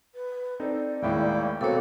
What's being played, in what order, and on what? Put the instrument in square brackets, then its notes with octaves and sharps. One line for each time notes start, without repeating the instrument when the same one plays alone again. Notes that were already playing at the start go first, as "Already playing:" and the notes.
[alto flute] B4
[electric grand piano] C4 D#4 A4 [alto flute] D5
[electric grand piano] D#2 A2 G#3 [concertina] A#3 E4 G5
[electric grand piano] B2 F#4 [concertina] A#3 C4 [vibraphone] A4 C#5